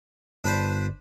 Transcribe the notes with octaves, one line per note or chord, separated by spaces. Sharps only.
G1 D4 B4 C5